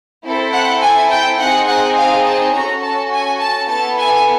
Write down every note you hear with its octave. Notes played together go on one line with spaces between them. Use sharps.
C4 E4 A4
F#5
G#5
G5
C4 D#4 G#4 F#5
F#5
F5
A5
C#4 F#4 A4 A#5
A5
G#5
A5
B3 E4 A4 A5
G#5